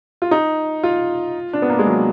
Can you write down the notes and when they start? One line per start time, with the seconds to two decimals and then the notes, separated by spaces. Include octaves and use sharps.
0.22 F4
0.31 D#4
0.83 F4
1.53 D4
1.62 B3
1.70 A#3
1.79 G#3
1.86 F#3